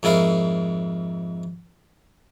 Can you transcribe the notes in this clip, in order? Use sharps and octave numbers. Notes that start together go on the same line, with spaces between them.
F2 G#2 E4 A#4 F5